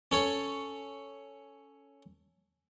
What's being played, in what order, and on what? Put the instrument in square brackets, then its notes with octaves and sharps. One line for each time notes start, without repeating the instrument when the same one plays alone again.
[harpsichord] C#4 A4 C#5